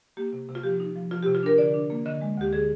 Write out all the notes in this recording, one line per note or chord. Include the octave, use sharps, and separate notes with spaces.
A#3 G4
C3
C3
F4
F3 G4
D#4
F3
F3 F4
C3 G4
F4
D4 A#4
D3 D5
D4
A#3
D3 D#5
G#3
D2 G4
D3 G#4